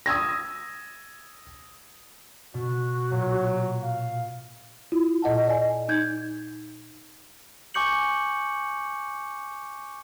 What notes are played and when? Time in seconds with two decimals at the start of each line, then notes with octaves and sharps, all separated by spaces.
0.06 D#6 E6 G#6 A#6
2.54 B2 F#4
3.12 A#2 F#3
3.82 F5
4.92 E4 F4
5.22 A#2 D#5 F#5 A5
5.47 D5 D#5 G#5
5.89 D#4 G6 G#6
7.74 G#5 C#6 D6 G6 C#7 F#7